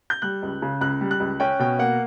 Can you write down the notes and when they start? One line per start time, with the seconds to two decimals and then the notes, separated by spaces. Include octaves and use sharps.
0.10 G6
0.22 G3 F#6
0.42 C#2
0.62 C#3
0.81 C#2 F#6
1.01 G3
1.11 F#6
1.20 C#2
1.40 C#4 G5
1.59 B2 G5
1.79 A#3 F#5